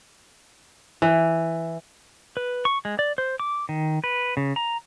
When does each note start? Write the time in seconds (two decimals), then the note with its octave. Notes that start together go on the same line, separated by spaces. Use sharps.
1.02 E3
2.37 B4
2.65 C#6
2.85 G#3
2.99 D5
3.18 C5
3.40 D6
3.69 D#3
4.04 B4
4.37 C#3
4.56 A#5